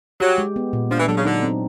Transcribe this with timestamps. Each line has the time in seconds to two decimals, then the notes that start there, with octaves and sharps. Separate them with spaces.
0.20 F#3 G4
0.38 G#3
0.56 B3
0.73 A#2
0.90 F3 D4
0.99 E3
1.08 D3 F#3
1.17 C#3
1.25 D3 D#4
1.43 C4